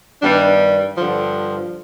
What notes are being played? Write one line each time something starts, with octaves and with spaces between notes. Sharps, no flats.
G2 D#3 G3 B3 D4
G2 D3 F3